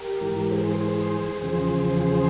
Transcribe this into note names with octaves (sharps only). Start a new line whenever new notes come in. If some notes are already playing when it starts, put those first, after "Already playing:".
Already playing: G4 A#4
G#2 E3
G#4 C5
G#4 C5
E2 C#3 F3 G#4 C5
G#4 C5